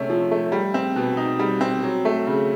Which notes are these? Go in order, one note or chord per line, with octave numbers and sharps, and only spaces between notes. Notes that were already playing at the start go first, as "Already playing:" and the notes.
Already playing: C3 A3 C#4
F3
A3
G3
C4
B2
D#4
G3
C4
F#3
A3
C#3